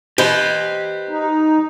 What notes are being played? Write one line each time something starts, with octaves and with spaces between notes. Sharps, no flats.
G4 B4 C5 D#5
D#4